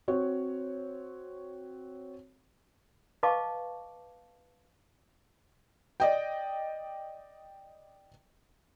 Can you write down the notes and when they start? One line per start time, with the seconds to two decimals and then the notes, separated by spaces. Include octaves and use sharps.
0.08 C4 F#4 C#5
3.23 B4 D#5 F5 A5 C#6 D6
6.00 D5 D#5 G5